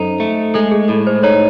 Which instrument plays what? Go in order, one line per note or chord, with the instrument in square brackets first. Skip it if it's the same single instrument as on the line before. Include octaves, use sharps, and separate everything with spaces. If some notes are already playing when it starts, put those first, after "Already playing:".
Already playing: [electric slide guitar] F#2 D#4 [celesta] A4 C5
[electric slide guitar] A3
[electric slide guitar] G#3 [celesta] A4
[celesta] G#4
[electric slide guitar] A2 [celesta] A4
[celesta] C5
[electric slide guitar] D#4 [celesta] C#5